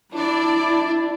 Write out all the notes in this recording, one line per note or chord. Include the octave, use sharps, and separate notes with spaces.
D4 E4 D5